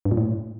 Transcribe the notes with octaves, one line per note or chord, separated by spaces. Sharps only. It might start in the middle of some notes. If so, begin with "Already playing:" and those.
G2
A#2
A2